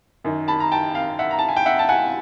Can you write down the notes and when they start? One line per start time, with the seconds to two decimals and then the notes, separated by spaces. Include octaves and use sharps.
0.24 F#2 D#3
0.48 A5 B5
0.60 A#5
0.72 G5 A5
0.95 F5 G5
1.19 E5 F#5
1.31 A#5
1.39 A5
1.49 G#5
1.56 G5
1.66 E5 F#5
1.79 A5
1.89 F#5 G#5